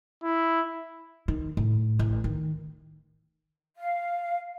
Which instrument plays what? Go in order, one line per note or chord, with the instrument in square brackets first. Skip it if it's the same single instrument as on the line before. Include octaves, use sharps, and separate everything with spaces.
[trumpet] E4
[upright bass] D#3
A2
A1
D#3
[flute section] F5